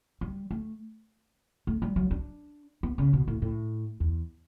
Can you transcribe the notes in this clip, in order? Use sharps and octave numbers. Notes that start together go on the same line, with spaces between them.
G3
A3
A3
G3
F#3
D4
B3
C#3
B2
A2
A2
E2